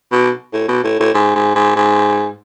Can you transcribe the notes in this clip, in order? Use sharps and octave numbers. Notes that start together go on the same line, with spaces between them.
B2
A2
B2
A2
A2
G#2
G#2
G#2
G#2